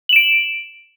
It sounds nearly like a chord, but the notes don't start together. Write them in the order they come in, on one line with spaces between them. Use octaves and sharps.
F#7 E7 D7